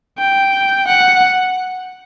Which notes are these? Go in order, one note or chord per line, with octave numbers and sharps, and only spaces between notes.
G5
F#5